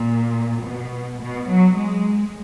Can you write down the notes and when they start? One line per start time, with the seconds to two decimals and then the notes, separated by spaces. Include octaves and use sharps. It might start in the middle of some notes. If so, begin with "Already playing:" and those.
Already playing: A#2
0.63 B2
1.20 B2
1.47 F#3
1.76 G#3